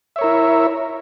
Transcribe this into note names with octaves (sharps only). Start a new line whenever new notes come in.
E4 A#4 C#5 E5